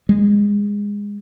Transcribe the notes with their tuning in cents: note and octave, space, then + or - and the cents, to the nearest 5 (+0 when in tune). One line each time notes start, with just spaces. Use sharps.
G#3 -20